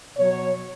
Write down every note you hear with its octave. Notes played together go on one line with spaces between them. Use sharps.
B2 F#3 C#5